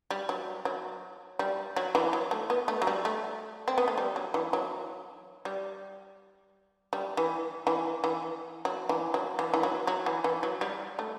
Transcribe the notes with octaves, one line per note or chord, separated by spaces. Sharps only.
G3
F#3
F#3
G3
F#3
E3
F#3
A3
B3
A3
F#3
G3
A3
C4
B3
A3
G3
F#3
E3
F#3
G3
G3
E3
E3
E3
F#3
E3
F#3
E3
E3
F#3
F#3
E3
E3
F#3
G3
A3